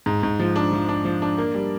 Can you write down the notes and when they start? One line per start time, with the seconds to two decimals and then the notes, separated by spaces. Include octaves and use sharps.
0.06 G#2
0.23 G#2
0.40 F3
0.56 D4
0.73 F3
0.89 D4
1.05 F3
1.22 D4
1.38 A#3
1.55 G3